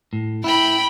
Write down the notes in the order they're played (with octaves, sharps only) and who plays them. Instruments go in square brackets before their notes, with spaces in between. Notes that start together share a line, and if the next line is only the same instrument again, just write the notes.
[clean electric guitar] A2
[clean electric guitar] E4 [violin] G5 B5